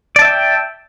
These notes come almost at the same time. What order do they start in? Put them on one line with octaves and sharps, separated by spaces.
D5 A5 E5 G5